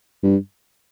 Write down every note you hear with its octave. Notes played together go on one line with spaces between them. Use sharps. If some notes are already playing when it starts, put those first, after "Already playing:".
G2